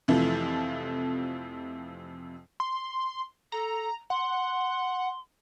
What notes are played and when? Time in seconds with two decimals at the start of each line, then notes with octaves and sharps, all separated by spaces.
0.08 F2 C3 E3 F3 A3
2.60 C6
3.52 A4 A#5
4.10 F#5 C6